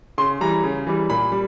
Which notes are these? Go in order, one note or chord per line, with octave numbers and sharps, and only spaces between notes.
C#3 C6
E3 G3 A#5
C#3
E3 G3
A#2 B5
G3